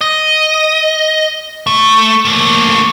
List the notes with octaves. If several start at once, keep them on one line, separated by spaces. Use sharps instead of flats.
D#5
A3
A3 A#3